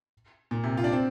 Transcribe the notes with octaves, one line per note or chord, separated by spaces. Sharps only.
A#2
C3
F4
D4
C4